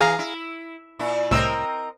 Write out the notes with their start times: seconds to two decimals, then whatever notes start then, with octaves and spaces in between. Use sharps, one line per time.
0.01 E3 G#4 F5 A#5
0.19 E4
0.99 A#2 E4
1.31 C2 A2 C4 A#4 D#5 E6